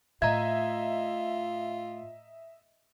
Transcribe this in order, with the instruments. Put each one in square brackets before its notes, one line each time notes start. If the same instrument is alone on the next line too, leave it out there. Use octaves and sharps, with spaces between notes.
[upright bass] A2 [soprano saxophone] F4 [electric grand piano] D#5 E5 [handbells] A#5 G#6